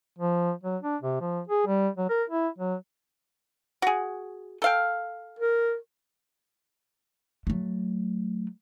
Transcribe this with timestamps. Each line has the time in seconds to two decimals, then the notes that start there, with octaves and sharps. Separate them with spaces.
0.18 F3
0.63 F#3
0.83 D4
1.01 C3
1.21 F3
1.48 G#4
1.67 G3
1.97 F#3
2.09 A#4
2.30 E4
2.58 F#3
3.82 F#4 G#4
4.62 A4 F5 G5
5.39 A#4
7.47 F#3 A3